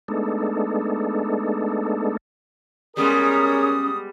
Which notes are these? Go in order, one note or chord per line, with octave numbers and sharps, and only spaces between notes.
G#3 A3 B3 D4 D#4 A4
G3 G#3 B3 C#4 G#4 A#4 C#5 D#6